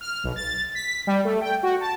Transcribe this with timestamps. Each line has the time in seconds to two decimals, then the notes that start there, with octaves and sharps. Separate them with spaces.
0.01 F6
0.24 B1
0.36 A6
0.75 B6
1.07 G3
1.25 A3
1.41 G5
1.63 F#4
1.81 A5